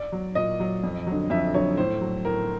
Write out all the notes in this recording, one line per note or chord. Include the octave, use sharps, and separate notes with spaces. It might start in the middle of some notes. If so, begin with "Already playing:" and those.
Already playing: D5
F#3
A#2 D#5
F#3
F2
D3 F#3
F2 E5
D3 F#3 C#5
A2 C5
F#3
A2 A#4